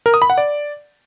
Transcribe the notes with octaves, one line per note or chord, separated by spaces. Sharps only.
A#4
D#6
B5
F#5
D5